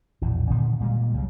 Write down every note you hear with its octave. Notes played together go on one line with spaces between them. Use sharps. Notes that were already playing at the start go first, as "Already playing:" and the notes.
A#1 E2 A2
A#2 D3 D#3 B3
A#2 G3 G#3
C#2 C#3 F#3